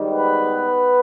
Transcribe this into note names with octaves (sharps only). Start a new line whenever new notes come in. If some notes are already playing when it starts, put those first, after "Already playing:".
Already playing: G#2 D#3 G3
B3 B4